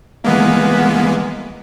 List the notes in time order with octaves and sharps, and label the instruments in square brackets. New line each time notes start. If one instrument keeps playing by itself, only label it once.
[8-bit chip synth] E3 G#3 A#3 [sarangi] B3